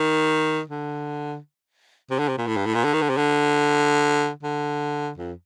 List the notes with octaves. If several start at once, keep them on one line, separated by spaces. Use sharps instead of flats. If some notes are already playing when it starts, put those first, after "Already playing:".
Already playing: D#3
D3
C3
D3
C3
A#2
A2
G2
A2
A#2
D3
D#3
D3
C3
D3
D3
F2